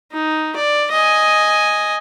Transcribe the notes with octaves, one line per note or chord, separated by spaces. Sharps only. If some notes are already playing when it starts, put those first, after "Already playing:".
D#4
D5
D#5 G#5